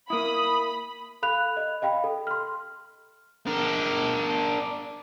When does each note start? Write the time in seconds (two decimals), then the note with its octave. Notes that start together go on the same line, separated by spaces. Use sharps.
0.10 A#3 E4 B5 D#6
1.22 A4 F5 B5 F#6 F7
1.57 D#5
1.82 D#5 F5 G5 B5
2.04 A4
2.27 C6 F6
3.46 D4 A#4